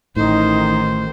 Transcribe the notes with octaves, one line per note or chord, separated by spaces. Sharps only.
A1 A2 D#3 D#4 C5